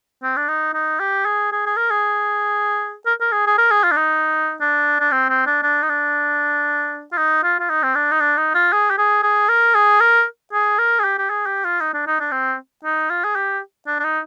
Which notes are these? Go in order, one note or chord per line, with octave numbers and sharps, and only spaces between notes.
C4
D4
D#4
D#4
G4
G#4
G#4
G#4
A#4
G#4
A#4
A#4
G#4
G#4
A#4
G#4
F4
D4
D#4
D4
D4
C4
C4
D4
D4
D#4
D4
F4
D#4
F4
F4
D#4
C4
D4
D#4
D4
D#4
F4
G#4
G4
G#4
G#4
A#4
G#4
A#4
G#4
A#4
G#4
G4
G4
G#4
G4
F4
D#4
D4
D#4
D4
C4
D#4
F4
G#4
G4
D4
D4
D#4